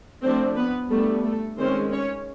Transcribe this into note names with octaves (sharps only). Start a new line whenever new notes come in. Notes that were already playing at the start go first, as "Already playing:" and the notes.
F3 A3 C4 D4 C5
B3 B4
G3 A3 B3 D4 A4
A3 A4
D#3 G#3 C4 C#4 C5
C#4 C#5